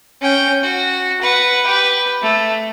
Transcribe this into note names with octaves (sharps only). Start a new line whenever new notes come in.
C#4 G5
F#4
B4 F#5
G4 B4
A3